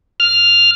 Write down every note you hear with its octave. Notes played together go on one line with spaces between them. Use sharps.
F6